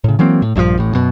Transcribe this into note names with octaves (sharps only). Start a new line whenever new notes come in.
A2 C#3
E3 F#3 A#3 C4
A2
A#1 G2 E3 F3
A1 A2
F#2 B2